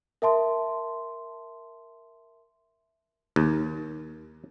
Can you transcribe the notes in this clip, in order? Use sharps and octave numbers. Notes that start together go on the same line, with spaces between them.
A#4 E5 A5 C6
D#2